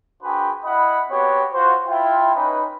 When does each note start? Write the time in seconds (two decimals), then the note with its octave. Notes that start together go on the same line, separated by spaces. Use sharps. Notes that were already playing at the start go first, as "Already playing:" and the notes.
0.23 D4 F#4 G#4 B4 C5 G5
0.64 E4 D#5 F#5 B5
1.10 B3 C4 F#4 G4 B4 C#5
1.53 F4 F#4 C5
1.88 E4 F4 G5
2.35 C#4 D#4 B4